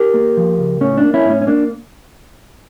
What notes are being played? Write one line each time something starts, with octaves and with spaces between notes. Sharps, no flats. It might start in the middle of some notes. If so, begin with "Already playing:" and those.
Already playing: G4 A#4
A#3
F3
C#2
A2 C#4
D4
A#3
C#4 E4
A2 C#4
C#4
A#3 D4